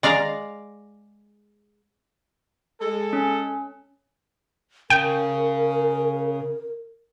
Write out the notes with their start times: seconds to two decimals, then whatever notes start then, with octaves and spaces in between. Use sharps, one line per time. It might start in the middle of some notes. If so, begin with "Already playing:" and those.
0.03 G#3 D5 F5 A#5
2.81 G#3 A4
3.13 C#4
4.90 C#3 A#4 G5